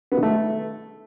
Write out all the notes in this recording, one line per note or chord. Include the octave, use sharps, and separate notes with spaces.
B3
D#3
A3